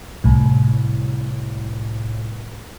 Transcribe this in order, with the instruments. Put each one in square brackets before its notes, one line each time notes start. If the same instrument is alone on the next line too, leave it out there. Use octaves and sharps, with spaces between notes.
[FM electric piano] C2 A2